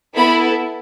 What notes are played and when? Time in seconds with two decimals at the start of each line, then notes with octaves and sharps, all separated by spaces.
0.16 B3 E4 A4 B5